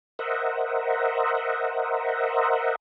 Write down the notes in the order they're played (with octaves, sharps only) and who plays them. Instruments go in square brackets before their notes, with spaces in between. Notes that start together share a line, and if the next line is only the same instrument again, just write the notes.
[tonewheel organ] A#4 C5 D#5 E5 F#5